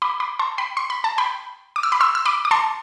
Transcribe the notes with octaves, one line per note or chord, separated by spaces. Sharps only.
B5 D6
B5 D6
A5 C6
G5 B5
C6
B5
A5
G5 B5
D6
E6
B5 D6
C6 E6
E6
B5 D6
D6
A5 C6